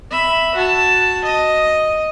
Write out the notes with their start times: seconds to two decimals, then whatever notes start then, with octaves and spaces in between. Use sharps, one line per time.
0.11 E5 B5
0.55 F#4 A5
1.24 D#5